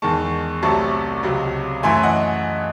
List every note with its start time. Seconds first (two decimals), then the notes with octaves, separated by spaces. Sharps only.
0.02 E2 D#3 G#3 A5 C#6
0.62 C2 C3 F#3 A3 A5 C#6
1.23 C#2 C3 F#3
1.83 F#2 E3 A3 G#5 C6
2.03 D#5 F#5